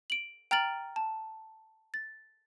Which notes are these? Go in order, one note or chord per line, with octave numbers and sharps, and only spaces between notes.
D7 F#7
G5 A#5 F6 A6 D7 F#7
A5
A6